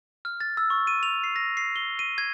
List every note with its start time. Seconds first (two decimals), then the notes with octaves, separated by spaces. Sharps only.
0.25 F6
0.40 A6
0.57 E6
0.70 C#6
0.87 D#7
1.03 F7
1.24 C7
1.36 A#6
1.57 C7
1.76 G7
1.99 D#7
2.18 G#6